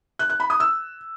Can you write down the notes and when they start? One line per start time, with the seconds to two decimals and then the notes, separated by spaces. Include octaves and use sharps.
0.19 F#6
0.30 F#6
0.40 B5
0.50 D#6
0.60 E6